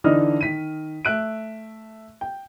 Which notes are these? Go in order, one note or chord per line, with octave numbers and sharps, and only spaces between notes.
D3 E3 D4 D#4 D#5 F6
D#3 B6 D#7
A3 E5 F#6 D7
G5